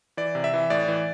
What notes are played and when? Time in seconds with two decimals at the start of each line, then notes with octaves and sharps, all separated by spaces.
0.17 E3 D5
0.35 C3
0.44 E5
0.53 E3
0.70 A2 D5
0.88 E3